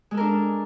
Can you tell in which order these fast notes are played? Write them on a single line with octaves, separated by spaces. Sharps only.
G#3 A4 A#4 D4